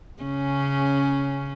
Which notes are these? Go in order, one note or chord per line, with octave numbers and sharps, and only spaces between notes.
C#3 C#4